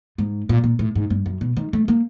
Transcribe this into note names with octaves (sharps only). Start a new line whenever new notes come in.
G#2
A#2
A#2
A2
G#2
G2
F#2
B2
D#3
A3
A#3